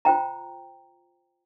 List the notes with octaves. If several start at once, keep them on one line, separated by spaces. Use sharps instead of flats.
F4 C5 G5 A#5